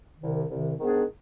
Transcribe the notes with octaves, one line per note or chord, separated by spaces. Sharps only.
C2 C3 D#3
C2 C3 D#3
G#2 D#3 B3 D4 G#4